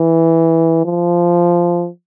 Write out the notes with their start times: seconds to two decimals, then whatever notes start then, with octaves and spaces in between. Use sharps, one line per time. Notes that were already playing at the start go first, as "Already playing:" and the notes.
Already playing: E3
0.85 F3